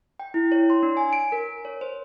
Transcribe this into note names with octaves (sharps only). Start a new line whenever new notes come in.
G5
E4
C#5
C6
D4
G#5
D7
A#4
C#5
C5